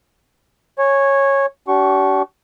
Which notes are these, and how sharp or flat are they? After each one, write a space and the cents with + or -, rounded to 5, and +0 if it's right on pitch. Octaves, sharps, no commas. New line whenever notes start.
C#5 -10 G#5 +0
D4 -40 G4 -45 C#6 +0